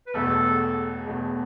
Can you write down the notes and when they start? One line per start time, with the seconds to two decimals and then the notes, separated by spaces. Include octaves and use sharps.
0.07 B4
0.14 E1 E2 B2 A3 A4
1.06 E1 E2 B2 A3